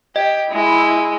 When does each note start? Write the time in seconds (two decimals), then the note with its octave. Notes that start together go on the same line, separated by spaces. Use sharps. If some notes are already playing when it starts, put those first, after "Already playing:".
0.16 G4 D#5
0.51 G#3 E4